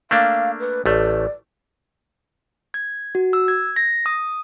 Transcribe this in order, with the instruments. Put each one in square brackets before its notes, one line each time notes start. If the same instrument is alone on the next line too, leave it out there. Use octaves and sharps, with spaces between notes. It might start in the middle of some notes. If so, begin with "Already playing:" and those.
[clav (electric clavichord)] A3 A#3 D4 [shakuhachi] F5
[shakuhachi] B4
[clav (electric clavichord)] A1 A3 [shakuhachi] D5
[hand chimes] G#6
F#4
E6
G#6
A#6
D#6